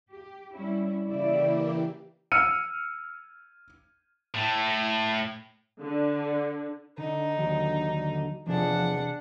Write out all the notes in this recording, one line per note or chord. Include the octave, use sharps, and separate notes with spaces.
G4
G3 C#4 E4
C#3 E3 A#3 E4 G4 D5
E6 F6 C#7 D#7
A2 A3
D3
D3 D#4
D#2 F#3 G4
E2 C3 F3 D4 G#4 F#5